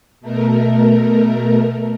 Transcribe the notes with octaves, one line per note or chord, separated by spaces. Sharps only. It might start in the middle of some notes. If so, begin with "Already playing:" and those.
B2 A3 A#4